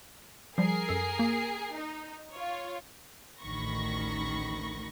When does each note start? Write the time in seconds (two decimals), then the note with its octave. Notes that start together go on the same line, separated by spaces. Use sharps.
0.58 F3 G3 G#4 A#4 C7
0.89 F#2 A4
1.19 A#3
1.74 D#4
2.32 F4 C#5
3.40 A1 D2 D#3 B5 C#6 A#6